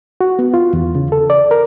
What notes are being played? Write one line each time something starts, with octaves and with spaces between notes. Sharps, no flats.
F#4
B3
F4
E2
C#3
A4
D5
A#4